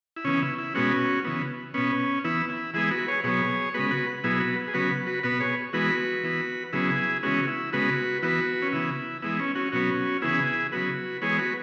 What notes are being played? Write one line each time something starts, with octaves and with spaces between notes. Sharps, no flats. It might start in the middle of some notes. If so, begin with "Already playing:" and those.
E4
C#3 E3 B3 C#4
E4
E4
B2 G#3 B3 C#4 F#4
C#3 E3 B3
B2 B3 C#4
E3 B3 E4
E4
E3 G#3 B3 E4 G#4
F#4 B4
G#4 C#5
B2 F#3 B3 G#4 C#5
C#3 G#3 B3 F#4 B4
F#4 B4
B2 F#3 B3 E4 G#4
F#4 B4
G#4
C#3 F#3 B3 F#4 B4
F#4 B4
B2 B3 F#4 B4
G#4 C#5
E3 G#3 B3 F#4 B4
E3 B3
C#3 F#3 B3 E4 G#4
C#3 E3 G#3 B3 C#4 F#4
E4
C#3 G#3 B3 F#4 B4
E3 B3 F#4 B4
C#4
C#3 E3 B3 E4
E3 G#3 B3 E4
C#4
C#4 F#4
B2 F#3 B3 C#4 F#4
C#3 E3 B3 E4 G#4
C#3 F#3 B3 F#4 B4
E3 G#3 B3 G#4 C#5
F#4 B4